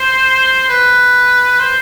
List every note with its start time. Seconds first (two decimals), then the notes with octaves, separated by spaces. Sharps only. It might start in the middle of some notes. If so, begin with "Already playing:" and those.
Already playing: C5
0.69 B4
1.60 C5